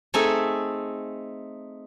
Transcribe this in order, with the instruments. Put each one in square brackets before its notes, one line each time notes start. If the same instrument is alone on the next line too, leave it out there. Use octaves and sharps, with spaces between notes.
[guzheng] A3 C4 D#4 G#4 A4